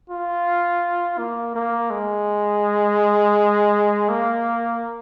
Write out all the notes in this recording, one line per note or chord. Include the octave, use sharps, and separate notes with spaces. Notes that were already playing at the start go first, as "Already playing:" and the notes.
F4
A#3
A#3
G#3
A#3